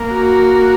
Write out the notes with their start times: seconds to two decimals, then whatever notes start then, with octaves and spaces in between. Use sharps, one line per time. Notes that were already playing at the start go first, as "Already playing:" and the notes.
Already playing: A#3
0.12 F#4